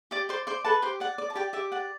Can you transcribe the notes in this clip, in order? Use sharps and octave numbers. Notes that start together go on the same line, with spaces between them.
G4 D5 D6
C5 D5 C6
C5 D5 C6
A4 B4 A5
G4 C5 C6
D5 F#5
D5
A5
G4 D5 G5
G4 E5
D5 F#5